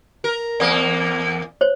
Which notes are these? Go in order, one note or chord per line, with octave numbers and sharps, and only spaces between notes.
A#4
E2 A#3 D5 D#6
C5 C#5